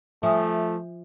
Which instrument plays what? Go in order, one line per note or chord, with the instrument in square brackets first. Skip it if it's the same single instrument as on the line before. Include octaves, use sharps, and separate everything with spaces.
[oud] F3 [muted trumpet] A3 [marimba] E5 G#5 D#6